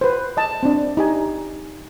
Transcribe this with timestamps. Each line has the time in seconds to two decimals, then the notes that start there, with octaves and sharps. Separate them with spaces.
0.01 B4 C5
0.37 D#5 A5
0.63 C4 D4
0.97 D#4 G4 G#5